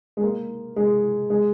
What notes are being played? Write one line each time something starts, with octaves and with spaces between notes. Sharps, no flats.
G#3
A#3
G#3
G#3